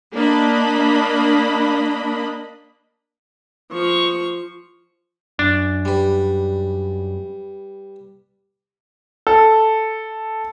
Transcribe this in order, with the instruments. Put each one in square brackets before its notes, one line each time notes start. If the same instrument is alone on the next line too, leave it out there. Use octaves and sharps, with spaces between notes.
[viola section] A#3 D4 D#5 B5
[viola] F3 C#6
[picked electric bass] F#2 [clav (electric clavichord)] D4
[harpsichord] G3 B4
[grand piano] A4